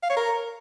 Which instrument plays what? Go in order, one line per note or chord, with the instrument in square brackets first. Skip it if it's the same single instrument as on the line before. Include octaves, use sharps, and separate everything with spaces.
[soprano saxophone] F5
C#5
A#4